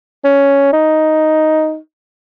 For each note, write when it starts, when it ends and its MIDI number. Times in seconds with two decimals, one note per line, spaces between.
0.25 0.68 61
0.73 1.77 63